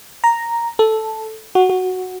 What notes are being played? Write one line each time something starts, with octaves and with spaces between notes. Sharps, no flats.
A#5
A4
F#4
F#4